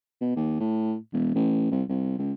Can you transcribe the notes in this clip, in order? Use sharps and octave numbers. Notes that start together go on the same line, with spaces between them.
B2
D#2
A2
E1
A1
C2
C2
C#2